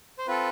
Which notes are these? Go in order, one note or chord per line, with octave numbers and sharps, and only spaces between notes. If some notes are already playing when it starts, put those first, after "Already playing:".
C5
C4 F4 A4 B4